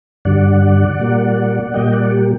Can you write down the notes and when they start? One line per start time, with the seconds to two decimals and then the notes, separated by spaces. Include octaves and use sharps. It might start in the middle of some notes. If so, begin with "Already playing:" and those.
0.25 G2 D3 G3 D5 F#5
1.00 A#2 G3 A#3
1.74 A#2 G3 A#3 D#5 G5
1.93 D5 F#5
2.11 G4